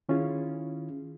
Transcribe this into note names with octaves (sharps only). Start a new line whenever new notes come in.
D#3 C#4 E4 F4 G#4